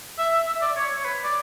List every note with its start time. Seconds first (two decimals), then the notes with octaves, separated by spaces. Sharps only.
0.18 E5
0.47 E5
0.62 D5
0.76 C#5
0.96 C#5
1.05 B4
1.24 D5